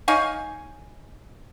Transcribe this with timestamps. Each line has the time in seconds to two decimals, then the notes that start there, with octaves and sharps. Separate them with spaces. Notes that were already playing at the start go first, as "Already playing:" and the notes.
0.08 D#4 C#5 F5 G#5